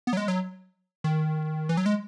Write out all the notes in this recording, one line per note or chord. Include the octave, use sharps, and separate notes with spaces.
B3
F#3
G#3
F#3
D#3
E3
F#3
G#3